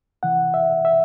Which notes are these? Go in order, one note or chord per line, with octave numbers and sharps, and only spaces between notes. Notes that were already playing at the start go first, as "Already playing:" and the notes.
C3 E3 F#5
E5
E5